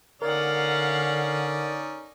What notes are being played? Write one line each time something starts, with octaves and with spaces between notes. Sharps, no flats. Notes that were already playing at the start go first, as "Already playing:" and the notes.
D3 C#4 D#4 A#4 D5 F5 F#5